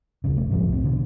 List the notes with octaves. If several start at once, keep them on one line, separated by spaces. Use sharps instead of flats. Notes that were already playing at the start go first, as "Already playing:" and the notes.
D#1 B1 C#3
F1 A3
A2 C3 F3 G#3
C2 C4
B2 D3